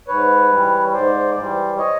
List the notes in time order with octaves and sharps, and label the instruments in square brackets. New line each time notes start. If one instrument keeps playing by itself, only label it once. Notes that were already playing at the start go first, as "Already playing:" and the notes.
[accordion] G#2 B4 C#5
E3 G3
G#2 C5 D5
E3 G3 C5 D5
C#5 D#5